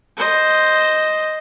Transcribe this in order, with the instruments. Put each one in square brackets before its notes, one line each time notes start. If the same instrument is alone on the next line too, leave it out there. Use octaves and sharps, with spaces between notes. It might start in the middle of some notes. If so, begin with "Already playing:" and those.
[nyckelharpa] C5 D#5